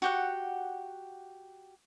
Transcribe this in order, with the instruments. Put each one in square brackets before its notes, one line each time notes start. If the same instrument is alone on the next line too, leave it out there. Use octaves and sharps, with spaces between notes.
[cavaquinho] F#4 G4 F#5